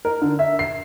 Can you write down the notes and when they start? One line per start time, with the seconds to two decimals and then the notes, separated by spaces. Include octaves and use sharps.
0.05 A#4
0.21 D3
0.39 E5
0.59 C7